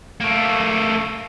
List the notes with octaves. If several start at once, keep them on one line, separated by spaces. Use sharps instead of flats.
A3 A#3